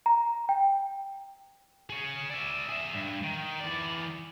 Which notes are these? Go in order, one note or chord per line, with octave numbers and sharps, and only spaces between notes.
A#5
G5
G#4 C#5
D5 E5
G#4 E5
G2
D#3
E3 D5